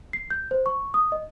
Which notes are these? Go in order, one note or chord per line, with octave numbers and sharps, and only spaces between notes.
C7
G6
C5
C#6
D#6
D#5